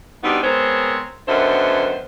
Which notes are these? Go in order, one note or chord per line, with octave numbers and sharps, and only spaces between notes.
G3 B3 C4 D4 D#4 F#4
G#3 B3 C4 A#4 C5 C#5
F#2 D3 D#3 B3 C5 E5